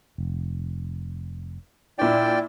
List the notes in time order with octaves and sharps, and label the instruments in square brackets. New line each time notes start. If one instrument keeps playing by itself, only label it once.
[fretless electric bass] F1
[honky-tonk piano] A#2 D4 [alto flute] E4 [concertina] D5 G5